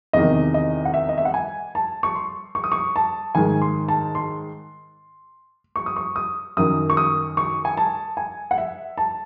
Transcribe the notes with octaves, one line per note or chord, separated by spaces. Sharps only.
E2 C3 D#3 D#5
D#5
F#5
E5
D#5
E5
F#5
G#5
A5
C#6
C6
C#6
D#6
C#6
A5
G#2 D#3 G#5
C6
A5
C6
C#6
D#6
C#6
D#6
F#2 D#3 D#6
C#6
D#6
C#6
G#5
A5
G#5
F#5
E5
A5